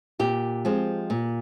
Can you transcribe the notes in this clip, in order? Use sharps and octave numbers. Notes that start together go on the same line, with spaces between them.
A#2 G4
F3 G#3 C4
A#2